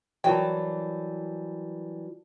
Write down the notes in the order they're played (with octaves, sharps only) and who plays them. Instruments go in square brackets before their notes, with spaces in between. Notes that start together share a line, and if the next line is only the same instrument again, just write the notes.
[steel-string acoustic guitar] E3 F#3 G3 [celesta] F#4 A#4 A5 [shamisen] G5